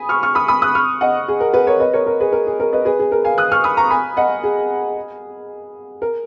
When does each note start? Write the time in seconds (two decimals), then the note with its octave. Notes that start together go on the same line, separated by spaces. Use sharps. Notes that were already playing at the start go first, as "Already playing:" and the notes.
Already playing: G#5 B5 D#6
0.09 C#6 F6
0.23 C#6 F6
0.35 B5 D#6
0.48 B5 D#6
0.62 D#6 F#6
0.75 C#6 F6
1.01 D#5 F#5
1.28 G#4
1.40 A#4
1.54 G#4 B4
1.67 A#4 C#5
1.80 B4 D#5
1.93 A#4 C#5
2.07 A#4
2.20 G#4 B4
2.33 A#4
2.47 G#4
2.60 A#4
2.73 B4 D#5
2.85 G#4 B4
2.99 G#4
3.12 A#4
3.25 F5 G#5
3.38 D#6 F#6
3.51 C#6 F6
3.64 B5 D#6
3.77 A#5 C#6
3.90 G#5 B5
4.17 D#5 F#5
4.43 G#4
6.02 A#4